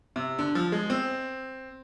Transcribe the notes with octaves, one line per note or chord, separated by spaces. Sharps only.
C3
D3
F3
G#3
C4